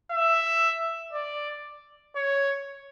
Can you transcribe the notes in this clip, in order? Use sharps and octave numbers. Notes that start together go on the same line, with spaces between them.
E5
D5
C#5